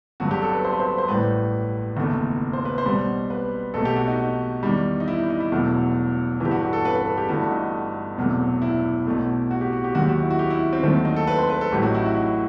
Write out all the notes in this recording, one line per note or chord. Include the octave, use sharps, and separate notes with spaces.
G1 G2 F#3 F#4
G4
A4
B4
C5
B4
C5
C5
A1 A2 G3 B4
F#1 E2 D#3 A3
C5
B4
C5
B1 B2 G3
B4
B1 B2 A3 A4
G4
F#4
D#4
D#4
E2 D#3 G3
D#4
E4
D#4
D#4
E4
E1 E2 B2 F#3 A3
G1 G2 E3 G4
F#4
G4
A4
B4
B4
A4
G4
G1 G2 E3 A3 F#4
D#4
E1 E2 C3 F#3 A3
E4
B1 B2 A3
F#4
G4
F#4
G4
D#2 D#3 F#3 F#4
G4
F#4
E4
F#4
G4
E4
C4
D#2 D#3 F#3 A3 C4
D#4
A4
B4
C5
B4
A4
A1 A2 F#3 G4
F#4
D#4
E4
F#4
D#4